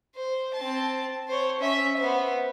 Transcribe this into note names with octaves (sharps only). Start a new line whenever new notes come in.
C5
C4 A5
C5 C#5
C#4 E5
B3 C5